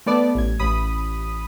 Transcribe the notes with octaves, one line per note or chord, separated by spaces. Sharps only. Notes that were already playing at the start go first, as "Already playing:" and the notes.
A3 B3 D5 A5
A1 G#6
A1 B5 D#6